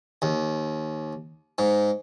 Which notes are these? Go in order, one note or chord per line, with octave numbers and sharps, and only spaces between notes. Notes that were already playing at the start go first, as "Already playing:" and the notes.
D#2
G#2